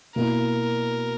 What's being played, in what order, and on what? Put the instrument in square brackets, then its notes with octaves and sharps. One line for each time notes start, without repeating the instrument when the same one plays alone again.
[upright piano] B2 A#3 E4 [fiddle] A#4